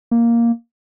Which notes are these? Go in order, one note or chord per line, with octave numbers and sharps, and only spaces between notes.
A#3